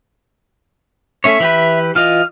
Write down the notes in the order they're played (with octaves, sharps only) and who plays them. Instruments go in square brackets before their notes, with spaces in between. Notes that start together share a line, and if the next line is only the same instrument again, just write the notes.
[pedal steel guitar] A3 C#4 C#5 [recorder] E5
[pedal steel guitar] E3 G4 B4
[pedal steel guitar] E3 F4 D#5 [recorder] F6